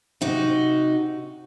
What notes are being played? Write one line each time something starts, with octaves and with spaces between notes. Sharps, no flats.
C3 D#4 F#4